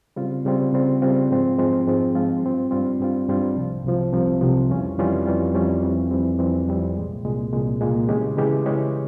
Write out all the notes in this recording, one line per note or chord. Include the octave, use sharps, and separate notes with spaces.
C#3 G3 C4 F4
C#3 G3 C4 F4
C#3 G3 C4 F4
C#3 G3 C4 F4
G#2 F3 G#3 C4 F4
G#2 F3 G#3 C4 F4
G#2 F3 G#3 C4 F4
G#2 F3 G#3 C4 F4
G2 G3 C4 F4
G2 G3 C4 F4
G2 G3 C4 F4
G2 G3 C4 F4
C2 C3 F3
C2 C3 F3
C2 C3 F3
C2 C3 F3
F2 E3 G3 C#4 F4
F2 E3 G3 C#4 F4
F2 E3 G3 C#4 F4
F2 E3 G3 C#4 F4
F2 E3 G3 C4
F2 E3 G3 C4
F2 E3 G3 C4
F2 E3 G3 C4
C2 A#2 G#3
C2 A#2 G#3
C2 A#2 G#3
C2 A#2 G#3
C#3 E3 G#3 C#4 G4
C#3 E3 G#3 C#4 G4
C#3 E3 G#3 C#4 G4